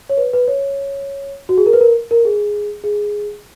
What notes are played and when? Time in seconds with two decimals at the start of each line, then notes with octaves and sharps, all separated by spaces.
0.09 C#5
0.17 B4
0.33 B4
0.48 C#5
1.49 F#4
1.58 G#4
1.66 A#4
1.73 B4
1.81 A#4
2.11 A#4
2.25 G#4
2.84 G#4